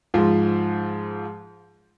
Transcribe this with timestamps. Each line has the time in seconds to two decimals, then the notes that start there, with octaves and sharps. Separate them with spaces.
0.14 G#2 F3